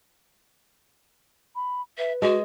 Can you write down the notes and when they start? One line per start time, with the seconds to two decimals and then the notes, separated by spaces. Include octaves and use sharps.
1.55 B5
1.98 B4 E5
2.22 G#3 F#4